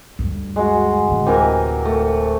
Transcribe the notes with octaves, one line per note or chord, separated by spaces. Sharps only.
D2 G2
G#3 F#4
D1 D3
C3 E3 A#4
A3